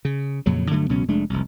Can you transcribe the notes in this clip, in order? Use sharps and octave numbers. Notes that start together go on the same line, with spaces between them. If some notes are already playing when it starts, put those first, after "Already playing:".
C#3
F2 A#2 C#3 F#3
G2 D3 F#3 A3
C#2 B2 F#3 C#4
F1 G#3 A3 D4
F1 C2